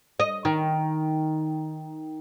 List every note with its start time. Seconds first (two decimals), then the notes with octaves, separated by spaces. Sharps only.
0.20 D#5
0.45 D#3